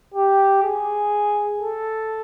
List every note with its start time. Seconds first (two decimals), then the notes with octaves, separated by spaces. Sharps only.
0.14 G4
0.63 G#4
1.61 A4